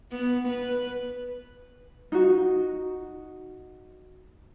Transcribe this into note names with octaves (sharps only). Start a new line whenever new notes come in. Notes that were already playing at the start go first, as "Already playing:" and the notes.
B3
B4
D#4 F#4